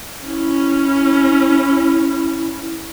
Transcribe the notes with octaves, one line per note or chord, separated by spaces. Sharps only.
C#4 E4